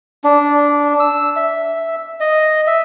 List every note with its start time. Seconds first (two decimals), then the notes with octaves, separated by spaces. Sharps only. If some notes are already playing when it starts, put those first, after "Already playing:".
0.24 D4
1.00 E6
1.36 E5
2.20 D#5
2.67 E5